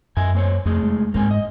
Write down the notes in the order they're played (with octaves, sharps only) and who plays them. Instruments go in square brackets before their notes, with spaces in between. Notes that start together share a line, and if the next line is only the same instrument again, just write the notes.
[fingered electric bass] F#2 [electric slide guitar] D#5 E5 G#5
[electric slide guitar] A#3 C5 C#5
[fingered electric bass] F2 [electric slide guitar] C3 A3 G#4
[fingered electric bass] G#3
[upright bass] G#2 [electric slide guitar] A#3 C4 G#5
[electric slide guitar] D#5